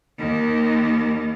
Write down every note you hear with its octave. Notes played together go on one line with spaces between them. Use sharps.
D#2 D#3